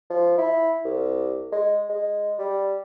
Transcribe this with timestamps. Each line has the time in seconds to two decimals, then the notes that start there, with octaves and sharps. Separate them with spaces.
0.10 F3
0.38 E4
0.85 C2
1.52 G#3
1.89 G#3
2.39 G3